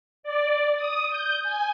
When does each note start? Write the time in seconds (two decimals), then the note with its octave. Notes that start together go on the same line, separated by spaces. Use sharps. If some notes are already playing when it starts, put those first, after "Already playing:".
0.23 D5
0.76 D#6
1.10 G6
1.43 G#5